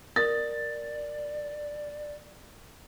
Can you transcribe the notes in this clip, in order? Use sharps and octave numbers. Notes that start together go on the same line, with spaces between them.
A#4 D5 D#6 A6